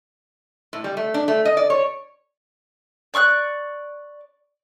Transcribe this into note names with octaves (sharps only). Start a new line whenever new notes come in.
A2
G3
A3
D4
A3
D#5
D5
C#5
D5 C#6 F6 F#6